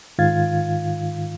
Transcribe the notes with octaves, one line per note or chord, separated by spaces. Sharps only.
G#2 D#3 F4 F5 G#6 A6